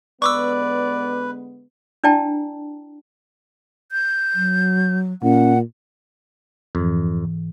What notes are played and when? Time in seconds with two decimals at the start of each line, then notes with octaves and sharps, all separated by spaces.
0.22 D3 G#3 B3 B4 D5 C#6 D6 E6
2.04 D4 E4 D5 G5 A5 A#5
3.92 G6
4.35 F#3
5.22 A#2 C#4 F#5
6.75 F2 G#2 E3